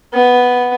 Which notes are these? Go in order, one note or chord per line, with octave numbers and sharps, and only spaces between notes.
B3